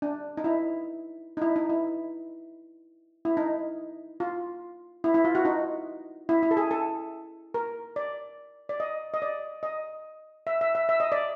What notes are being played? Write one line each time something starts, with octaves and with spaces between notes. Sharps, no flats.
D4
D#4
E4
D#4
E4
D#4
E4
E4
D#4
F4
E4
E4
F4
F#4
D#4
E4
E4
A4
G#4
A4
A#4
D5
D5
D#5
D#5
D5
D#5
E5
E5
E5
E5
D#5
D5